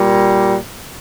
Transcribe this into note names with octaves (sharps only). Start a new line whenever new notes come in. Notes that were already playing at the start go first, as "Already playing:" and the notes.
Already playing: A#2 G3